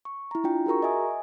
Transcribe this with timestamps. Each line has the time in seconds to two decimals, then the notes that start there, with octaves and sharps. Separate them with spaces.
0.05 C#6
0.31 E4 A#5
0.44 D4 F4 G5
0.66 F#4 G#4 A#4 A#5 C#6
0.83 D#5 E5 G#5 D#6